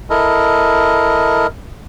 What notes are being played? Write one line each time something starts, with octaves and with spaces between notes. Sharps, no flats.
E4 A4 A#4 D#5